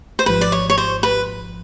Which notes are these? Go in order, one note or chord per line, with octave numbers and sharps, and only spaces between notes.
C5
G#1 G#2 F3 B4
D5
C#5
C#5
C5
B4